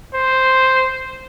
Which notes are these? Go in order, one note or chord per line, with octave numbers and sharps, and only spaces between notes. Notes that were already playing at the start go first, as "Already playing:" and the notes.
C5